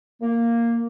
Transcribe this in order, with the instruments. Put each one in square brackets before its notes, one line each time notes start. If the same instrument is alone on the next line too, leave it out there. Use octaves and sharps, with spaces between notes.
[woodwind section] A#3